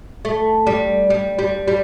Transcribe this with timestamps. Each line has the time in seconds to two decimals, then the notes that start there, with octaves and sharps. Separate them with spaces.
0.25 A3
0.67 G3
1.10 G3
1.39 G3
1.68 G3